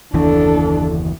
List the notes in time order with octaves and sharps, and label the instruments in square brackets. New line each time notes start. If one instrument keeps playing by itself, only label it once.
[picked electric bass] F#1 D#2 E3 [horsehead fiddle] D4 A4